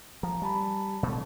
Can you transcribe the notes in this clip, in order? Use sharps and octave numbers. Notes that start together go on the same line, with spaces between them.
F3 A#5
G3 G#5 A5 B5
B2 A3